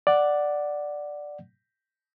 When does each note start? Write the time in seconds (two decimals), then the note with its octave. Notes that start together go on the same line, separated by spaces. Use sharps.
0.07 D5 F#5